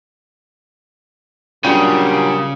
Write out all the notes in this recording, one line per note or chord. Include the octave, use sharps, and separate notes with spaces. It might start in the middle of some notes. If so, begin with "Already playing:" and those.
A#2 C#3 F#3 G3 D4 F4 G5